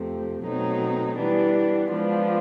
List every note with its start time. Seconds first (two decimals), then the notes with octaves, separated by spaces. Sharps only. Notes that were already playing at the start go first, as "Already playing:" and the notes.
Already playing: F2 C3 F3 A3 C4
0.43 B2 F#3 A3 C4 D#4
1.16 E3 G3 B3 D4
1.90 F3 G#3 B3 D4 F4